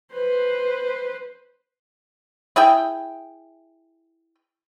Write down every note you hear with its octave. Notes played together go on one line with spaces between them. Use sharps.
B4 C5
E4 G#4 E5 G5